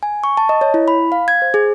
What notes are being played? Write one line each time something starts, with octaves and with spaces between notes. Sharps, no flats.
G#5
C#6
A5
D#5
C#5
E4
B5
F5
G#6
C5
G#4